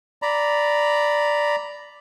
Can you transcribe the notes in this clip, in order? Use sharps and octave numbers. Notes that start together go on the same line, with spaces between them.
D5 A#5 B5